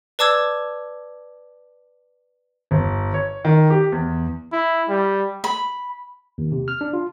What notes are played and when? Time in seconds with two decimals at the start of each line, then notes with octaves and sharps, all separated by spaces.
0.19 B4 D5 A5 D6 E6 G#6
2.71 G1
3.14 C#5
3.45 D#3
3.70 G4
3.92 E2
4.52 E4
4.89 G3
5.44 B5
6.38 D#2
6.52 C3
6.68 F6
6.81 D4
6.93 F4